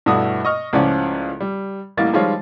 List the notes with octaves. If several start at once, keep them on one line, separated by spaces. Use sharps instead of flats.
G2 B2 A3 E4 F#4 D#6
D#5 C#6 F6
C#2 A2 F3 C#4 D5 F#5
G3
A1 A2 G3 A#3 A6
D#3 F3 G3 G#3 F4 C#5